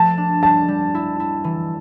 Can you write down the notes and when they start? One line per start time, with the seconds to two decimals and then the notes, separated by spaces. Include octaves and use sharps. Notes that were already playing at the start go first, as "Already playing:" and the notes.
Already playing: F3 A3 A5
0.18 D4
0.43 G3 A5
0.68 G3
0.95 E4
1.20 E4
1.44 E3